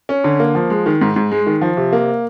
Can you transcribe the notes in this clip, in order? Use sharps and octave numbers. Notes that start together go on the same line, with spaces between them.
C#4
D3
A#3
F3
G#3
D#3
G#2
G#2
G#3
D#3
F3
C3
A#3